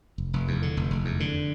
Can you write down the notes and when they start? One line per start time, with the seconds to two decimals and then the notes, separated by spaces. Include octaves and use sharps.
0.18 F1
0.33 F1
0.48 E2
0.62 D3
0.77 F1
0.91 F1
1.05 E2
1.20 D3